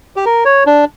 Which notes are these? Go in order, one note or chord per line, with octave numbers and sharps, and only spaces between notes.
G4
A#4
C#5
D4